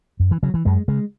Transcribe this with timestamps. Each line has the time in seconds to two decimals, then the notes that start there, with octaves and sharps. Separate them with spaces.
0.20 F#2
0.31 E3
0.43 C#3 F#3
0.54 E3
0.65 F#2 G#3
0.88 C#3 G#3